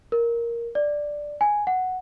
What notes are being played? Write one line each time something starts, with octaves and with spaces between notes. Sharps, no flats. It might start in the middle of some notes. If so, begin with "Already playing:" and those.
A#4
D5
G#5
F#5